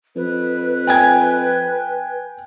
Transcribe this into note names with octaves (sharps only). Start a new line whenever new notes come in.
F2 B4
G5 G#5 G#6